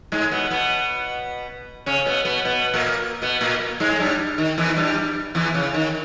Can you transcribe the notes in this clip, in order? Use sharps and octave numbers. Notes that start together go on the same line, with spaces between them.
G#2 G#3
B2 B3
B2 B3
C#3 C#4
B2 B3
B2 B3
B2 B3
A#2 A#3
B2 B3
A#2 A#3
G#2 G#3
G#3
G2 G3
D#3
E2 E3
G2 G3
E2 E3
C#3
D#3